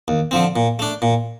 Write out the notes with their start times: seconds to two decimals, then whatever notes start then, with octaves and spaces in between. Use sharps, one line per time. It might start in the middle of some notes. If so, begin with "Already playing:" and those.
0.08 D#2
0.31 D3 F3 C4
0.56 A#2
0.79 A3 D4
1.02 A#2